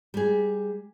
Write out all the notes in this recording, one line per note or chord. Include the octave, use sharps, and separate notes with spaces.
G3 G#4